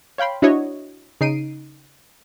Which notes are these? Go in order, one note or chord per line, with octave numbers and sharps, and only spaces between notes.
C#5 F5 G5 B5 C6
D4 E4 F#4 C#5 D#5
C#3 D#4 C7 D7 D#7